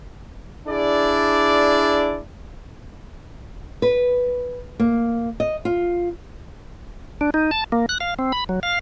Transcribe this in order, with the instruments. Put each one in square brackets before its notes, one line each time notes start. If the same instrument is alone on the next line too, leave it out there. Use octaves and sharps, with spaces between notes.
[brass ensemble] D4 E4 G#4 D5
[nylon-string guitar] B4
A#3
D#5
F4
[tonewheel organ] D4
D#4
A5
A#3
F#6
F5
C4
B5
F#3
F5